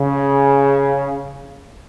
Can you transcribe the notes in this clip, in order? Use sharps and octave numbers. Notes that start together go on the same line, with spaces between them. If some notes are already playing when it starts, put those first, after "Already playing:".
Already playing: C#3